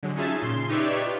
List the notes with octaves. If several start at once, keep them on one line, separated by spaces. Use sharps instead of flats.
D3 F#3 G#3
C#4 D#4 F4 G#4 E5 A5
A#2 C#3 C6
D#4 G4 B4 C#5 D5 E5
F4